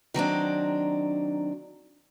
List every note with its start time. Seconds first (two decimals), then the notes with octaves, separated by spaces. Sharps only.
0.14 D#3 F#3 C4 D4